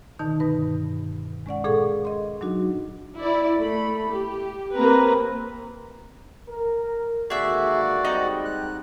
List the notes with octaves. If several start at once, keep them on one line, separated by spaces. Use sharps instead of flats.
B2 D3 D#3 D#4 A5
G2 B4 D#6
G#3 C#4 D5 F#5
A#2 G#4 A4 F5 C#6
D#5 C6
F#3 D4 D#4 F#4
E4 D5
A3 B5
G4
A#3 C4 A#4 B4 A#5
A#4
G#1 D3 A#3 F#4 G#4 D5 E5
G3 G#3 C4 D#4 F#5 A#5
F#6